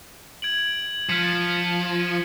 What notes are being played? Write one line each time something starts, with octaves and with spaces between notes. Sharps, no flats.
G#6 D7 F#7
F3 F6 B6 C#7